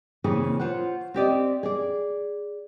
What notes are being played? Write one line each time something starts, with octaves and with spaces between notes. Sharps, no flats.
A#2 C#3 E3 A#3 C4 G#4
F4 C5 C#5 F#5
C4 G4 D5 D#5
G#4 D5